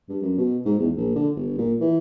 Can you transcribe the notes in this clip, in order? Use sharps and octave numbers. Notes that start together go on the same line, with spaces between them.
G2
F#2
B2
G#2
E2
A#1
D3
G1
A#2
E3